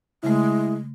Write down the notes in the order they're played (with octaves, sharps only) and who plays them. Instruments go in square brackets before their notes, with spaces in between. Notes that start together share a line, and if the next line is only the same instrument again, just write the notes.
[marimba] C#3 A3 [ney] G#3 [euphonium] E4